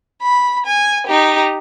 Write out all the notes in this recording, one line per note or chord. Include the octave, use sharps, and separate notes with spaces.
B5
G#5
D#4 G4